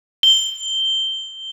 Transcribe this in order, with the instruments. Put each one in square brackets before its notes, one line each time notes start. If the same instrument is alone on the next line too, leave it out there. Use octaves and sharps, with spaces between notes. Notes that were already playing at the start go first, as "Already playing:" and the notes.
[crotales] G7